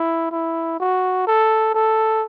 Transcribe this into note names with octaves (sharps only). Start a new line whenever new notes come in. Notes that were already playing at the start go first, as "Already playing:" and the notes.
Already playing: E4
E4
F#4
A4
A4